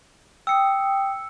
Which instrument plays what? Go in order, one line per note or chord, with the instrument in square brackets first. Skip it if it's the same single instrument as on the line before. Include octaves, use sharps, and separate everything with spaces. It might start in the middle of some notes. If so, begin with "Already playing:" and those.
[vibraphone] G5 D#6 [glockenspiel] E6 C#7